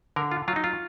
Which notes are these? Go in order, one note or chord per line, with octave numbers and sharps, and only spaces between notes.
D3 A#4
F4
F#3 F4
D#4
F4